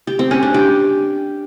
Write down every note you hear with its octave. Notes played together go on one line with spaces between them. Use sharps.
G4
C4
C#4
D4
G4